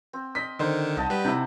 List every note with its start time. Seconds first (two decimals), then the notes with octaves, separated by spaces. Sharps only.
0.13 C4
0.35 D#5 B6
0.59 D3 D#3 D#4 C5
0.97 C2 D#5 F#5 A5
1.10 G3 B4
1.25 C3 D#4 E4